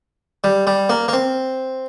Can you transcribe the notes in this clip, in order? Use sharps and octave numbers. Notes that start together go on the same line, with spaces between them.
G3
G3
A#3
A#3
C4